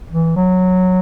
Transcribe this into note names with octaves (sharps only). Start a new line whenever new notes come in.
E3
F#3